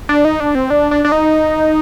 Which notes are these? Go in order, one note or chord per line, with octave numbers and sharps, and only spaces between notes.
D4
D#4
D4
C4
D4
D4
D4
D#4